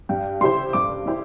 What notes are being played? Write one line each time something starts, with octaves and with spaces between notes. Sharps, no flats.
G2 G5
G3 E4 G4 C5 C6
G2 D6
G3 E4 G4 C5